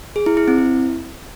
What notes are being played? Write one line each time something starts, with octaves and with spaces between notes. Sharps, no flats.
G#4
E4
E4
C4
E4